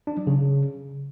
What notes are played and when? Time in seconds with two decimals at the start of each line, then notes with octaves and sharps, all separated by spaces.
0.07 D4
0.17 F#3
0.27 C#3